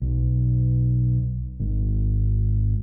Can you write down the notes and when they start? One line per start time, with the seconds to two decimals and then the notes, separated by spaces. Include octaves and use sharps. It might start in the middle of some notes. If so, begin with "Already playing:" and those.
0.02 B1
1.60 G#1